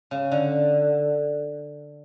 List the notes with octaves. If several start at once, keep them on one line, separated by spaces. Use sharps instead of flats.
C#3
D3